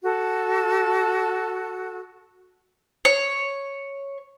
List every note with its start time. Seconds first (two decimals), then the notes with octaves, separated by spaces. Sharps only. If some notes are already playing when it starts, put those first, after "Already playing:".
0.02 F#4 A4
3.05 C#5